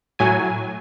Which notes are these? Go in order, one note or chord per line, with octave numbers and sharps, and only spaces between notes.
A2 F#3 G#5